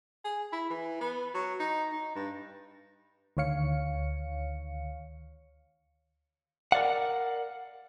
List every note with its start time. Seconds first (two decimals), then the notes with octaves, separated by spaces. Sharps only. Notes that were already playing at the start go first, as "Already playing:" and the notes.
0.25 G#4
0.53 E4
0.70 E3
1.01 B3
1.34 F#3
1.60 D#4
1.92 D#4
2.16 G2
3.37 D2 D#3 C#5 F5 C#7
6.72 A#4 D5 F5 F#5